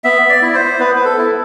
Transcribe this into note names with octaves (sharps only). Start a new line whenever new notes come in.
B3 E5
D5
E4
C5
B3 B4
B4
A4
E4